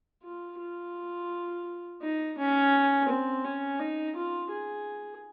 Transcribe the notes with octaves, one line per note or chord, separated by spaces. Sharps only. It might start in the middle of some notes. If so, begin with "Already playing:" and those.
F4
F4
D#4
C#4
C4
C#4
D#4
F4
G#4